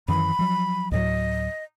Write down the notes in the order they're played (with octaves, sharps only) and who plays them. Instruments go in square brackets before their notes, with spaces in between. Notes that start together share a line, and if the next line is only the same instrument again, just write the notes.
[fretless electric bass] F#2 D#3 E3 [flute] B5
[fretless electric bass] F3 F#3
[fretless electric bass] D2 A2 F#3 [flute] D#5